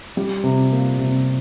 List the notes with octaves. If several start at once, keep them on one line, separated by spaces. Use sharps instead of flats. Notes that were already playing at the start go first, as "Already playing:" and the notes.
G3
C3
A#3
C3